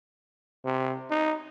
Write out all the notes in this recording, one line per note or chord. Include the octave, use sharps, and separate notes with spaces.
C3
D#4